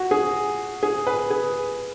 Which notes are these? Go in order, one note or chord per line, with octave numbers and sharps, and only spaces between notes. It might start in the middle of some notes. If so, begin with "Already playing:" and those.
Already playing: F#4
G#4
G#4
B4
G#4